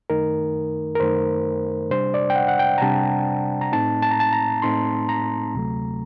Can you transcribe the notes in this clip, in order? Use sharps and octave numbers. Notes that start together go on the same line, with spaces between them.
F#2 D#3 A3 D#4 A#4
A#4
F#2 D#3 A3 D#4 C5
C3 G3 D4 C5
D5
G5
F#5
F#5
G5
A#5
C3 G3 D4 A5
A#5
A2 A3 C4 D#4 A5
A5
A#5
A5
A#5
A2 A3 C4 D#4 C6
A#5
D2 C3 F#3 A3